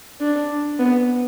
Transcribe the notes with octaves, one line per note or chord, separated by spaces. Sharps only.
D4
B3